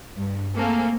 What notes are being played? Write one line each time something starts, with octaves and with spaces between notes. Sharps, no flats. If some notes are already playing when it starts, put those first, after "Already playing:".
G2
A3 A#3 C4 G#4 A4